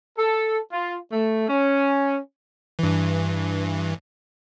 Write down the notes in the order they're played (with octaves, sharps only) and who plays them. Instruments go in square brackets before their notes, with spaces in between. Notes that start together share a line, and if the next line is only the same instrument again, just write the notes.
[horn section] A4
F4
A3
C#4
[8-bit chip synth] G2 E3